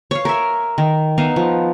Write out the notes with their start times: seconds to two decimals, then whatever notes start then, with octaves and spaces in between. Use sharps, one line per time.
0.11 C#5 F5
0.25 A#4 E5
0.78 D#3
1.18 B3 D#4 E5 F5
1.36 F3